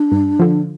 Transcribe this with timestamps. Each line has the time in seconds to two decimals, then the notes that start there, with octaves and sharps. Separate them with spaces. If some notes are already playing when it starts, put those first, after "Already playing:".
Already playing: D4
0.12 G2
0.39 D3 F3